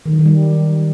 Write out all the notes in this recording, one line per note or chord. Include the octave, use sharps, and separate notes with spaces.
D#3
F#3
D#3
G3